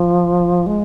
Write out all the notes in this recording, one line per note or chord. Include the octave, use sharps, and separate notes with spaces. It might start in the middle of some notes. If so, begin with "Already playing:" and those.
Already playing: F3
G#3